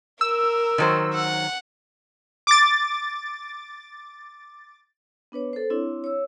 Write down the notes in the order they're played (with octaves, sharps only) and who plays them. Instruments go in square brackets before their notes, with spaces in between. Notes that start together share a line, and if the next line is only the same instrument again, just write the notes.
[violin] A#4 [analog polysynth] E6
[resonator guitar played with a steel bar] D#3 F#3 C5
[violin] F#5
[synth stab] D6 A6
[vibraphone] B3 D4 B4 C#5
A4 C5
C4 D4 E4 C#5
C#5 E6